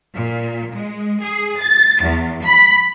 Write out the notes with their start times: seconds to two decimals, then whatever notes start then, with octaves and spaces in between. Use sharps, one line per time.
0.16 A#2
0.75 G#3
1.22 G#4
1.60 A6
2.02 E2
2.46 B5